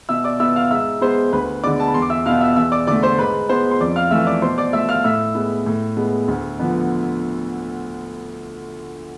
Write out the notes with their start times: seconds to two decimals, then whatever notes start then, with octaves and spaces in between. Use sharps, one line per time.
0.09 B2 E5 E6
0.24 D5 D6
0.40 B3 E5 E6
0.56 F5 F6
0.71 G#2 E5 E6
1.01 G#3 B3 C5 C6
1.33 D2 B4 B5
1.63 D3 G#3 B3 D5 D6
1.80 A5
1.88 B5
1.94 E2 C6
2.02 D6
2.10 E5 E6
2.26 B2 B3 F5 F6
2.41 E5 E6
2.56 E2 E5 E6
2.72 D5 D6
2.87 D3 A3 D5 D6
3.03 C5 C6
3.18 G#2 B4 B5
3.49 G#3 B3 C5 C6
3.71 C6
3.80 F2 D5 D6
3.96 F5 F6
4.11 E3 A3 E5 E6
4.27 D5 D6
4.42 B2 C5 C6
4.58 D5 D6
4.73 A3 E5 E6
4.89 F5 F6
5.04 A2 E5 E6
5.35 G#3 B3
5.66 A2
5.97 G#3 B3
6.28 D2
6.59 D3 F3 B3